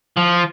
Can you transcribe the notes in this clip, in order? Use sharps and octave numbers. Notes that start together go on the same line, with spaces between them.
F3